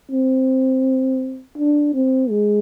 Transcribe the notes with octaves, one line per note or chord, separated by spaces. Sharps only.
C4
D4
C4
G#3